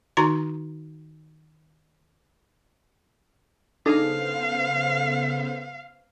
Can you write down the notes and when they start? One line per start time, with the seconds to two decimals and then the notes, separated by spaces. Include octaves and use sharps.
0.17 D#3 D#4 F#4 A#5 C6
3.86 C#3 B3 D4 D#4 G#4 A4 C5 F5